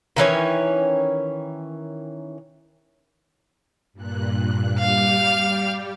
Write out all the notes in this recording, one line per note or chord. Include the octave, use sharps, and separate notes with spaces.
D#3 E3 C#4 C#5
G2 A#2 F#6
G3 G4 F5 F6